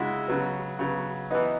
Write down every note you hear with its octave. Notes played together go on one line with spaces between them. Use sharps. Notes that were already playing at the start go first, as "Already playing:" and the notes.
Already playing: C#3 G#3 D#4 E4 F#4
C#3 F#3 B3
C#3 F#3 B3
E3 B3 D#4